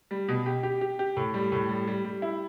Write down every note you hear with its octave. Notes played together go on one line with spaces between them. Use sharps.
G3
B2
G4
G4
G4
G4
A2
G3
A2
G3
G3
G3
E4